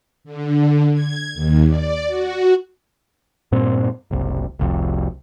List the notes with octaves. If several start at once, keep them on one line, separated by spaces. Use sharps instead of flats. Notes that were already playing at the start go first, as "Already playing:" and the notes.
D3
G#6
D#2
D5
F#4
G2 A#2 C4
F#1 C2
F1 C2 F2